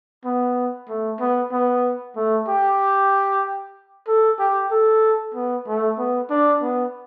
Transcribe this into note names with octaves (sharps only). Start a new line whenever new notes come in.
B3
A3
B3
B3
A3
G4
A4
G4
A4
B3
A3
B3
D4
B3